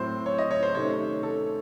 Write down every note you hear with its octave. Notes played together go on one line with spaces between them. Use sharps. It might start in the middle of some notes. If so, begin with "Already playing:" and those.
Already playing: A2 F#3 C4 C5
C#5
D#5
C#5
C5
C3 D#3 A3 C#4 C#5
A4